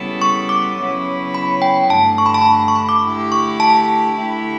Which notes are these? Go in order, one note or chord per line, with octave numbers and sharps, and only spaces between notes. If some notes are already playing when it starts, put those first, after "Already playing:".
Already playing: C#3 G3 B3 E4 A4
C#6
D6
C#3 F#3 B3 E4
B5
G5
G2 D3 A3 A5
C#6
B5
A5
B5
C#6
B5
D6
D3 A3 E4 G4
C#6
A5
D3 A3 E4 G4